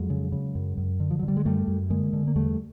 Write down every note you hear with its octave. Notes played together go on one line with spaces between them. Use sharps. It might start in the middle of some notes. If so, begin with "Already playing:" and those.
Already playing: F2 F#3 G#3
C#3
C#3
F#2
F#2
D3
F3
F#3
D3
G3
G#3
F#2 G3 A3
F#2
D3 G#3 A#3
D3
A#3
E2 G3 A3